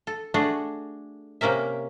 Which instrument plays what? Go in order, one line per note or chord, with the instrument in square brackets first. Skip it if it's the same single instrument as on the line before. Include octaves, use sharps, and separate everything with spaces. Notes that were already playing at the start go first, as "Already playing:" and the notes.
[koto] A4
A3 D4 F#4 G#4
C3 A#3 C#4 A#4 E5